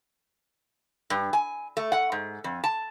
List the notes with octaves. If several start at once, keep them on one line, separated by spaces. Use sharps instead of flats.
G2
G#5
A3
F#5
G#2
F2
A5